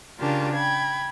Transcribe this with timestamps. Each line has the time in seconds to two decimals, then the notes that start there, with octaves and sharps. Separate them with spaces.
0.18 C#3 D4 F4 G4 A#4
0.54 G5 B5 G#6